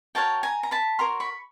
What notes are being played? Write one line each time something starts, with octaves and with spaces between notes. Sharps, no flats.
F#4 A#4 C#5 G5 A5
G#5 A#5
A#5
A5 B5
F#4 A#4 C#5 A#5 C6
B5 C#6